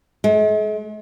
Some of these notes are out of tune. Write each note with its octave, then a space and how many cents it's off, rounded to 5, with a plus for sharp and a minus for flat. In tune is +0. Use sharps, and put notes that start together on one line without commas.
G#3 +45